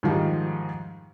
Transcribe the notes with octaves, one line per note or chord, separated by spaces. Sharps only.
G#2 D#3 F3 G3